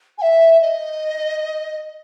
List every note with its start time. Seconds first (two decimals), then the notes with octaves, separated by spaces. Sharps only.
0.18 G#5
0.22 E5
0.61 D#5